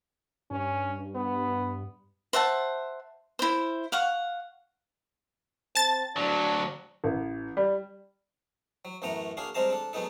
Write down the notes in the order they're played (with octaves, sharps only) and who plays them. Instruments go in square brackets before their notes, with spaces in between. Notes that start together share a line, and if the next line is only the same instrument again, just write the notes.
[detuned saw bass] G2 [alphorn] C#4
[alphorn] B3
[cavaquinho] C5 E5 F#5 A5
E4 C5
F5 F#5 C#6
[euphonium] C4 [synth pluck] A5 A6
[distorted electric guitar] D2 F#3 [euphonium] D4
[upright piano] A1
G3
[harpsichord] F#3
A1 F#2 A3 B3 F#5 A#5
A#3 D4 F#4 G#4 F5
G3 G#3 C4 F5 A5 A#5
D4 A4
B2 F#3 G#3 B3 D#4 A4